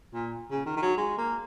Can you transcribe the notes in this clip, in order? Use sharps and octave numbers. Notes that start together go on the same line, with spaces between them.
A#2
C#3
D#3
D#3
F#3
G#3
A#3